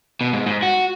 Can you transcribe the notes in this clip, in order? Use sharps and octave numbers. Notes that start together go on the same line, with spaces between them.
B2
G#2
G#2
F#4